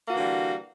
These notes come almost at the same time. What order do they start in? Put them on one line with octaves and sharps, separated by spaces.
A#3 F#4 E3 D3 G3